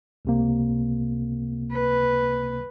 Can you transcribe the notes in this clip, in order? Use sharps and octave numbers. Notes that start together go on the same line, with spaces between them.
C#2 C3 A#3
B4